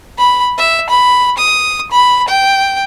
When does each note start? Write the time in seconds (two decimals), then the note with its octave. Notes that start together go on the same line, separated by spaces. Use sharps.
0.18 B5
0.58 E5
0.90 B5
1.37 D#6
1.91 B5
2.28 G5